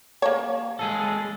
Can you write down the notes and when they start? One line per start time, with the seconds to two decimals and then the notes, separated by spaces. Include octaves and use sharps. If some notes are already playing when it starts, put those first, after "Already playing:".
0.22 A#3 C#5
0.79 G#3 G#4 A4